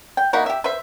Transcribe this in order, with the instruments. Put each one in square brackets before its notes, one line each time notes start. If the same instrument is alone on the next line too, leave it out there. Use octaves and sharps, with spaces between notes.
[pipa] G5
A#3 D#4 E4 F#4
G4 E5
B4 C5 E5